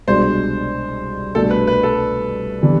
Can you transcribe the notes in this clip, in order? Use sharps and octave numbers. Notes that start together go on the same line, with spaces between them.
C2 B2 G#3 D4 C5
C2 B2 A3 D4 A4
B4
B4
A4
C3 E3 B3 D4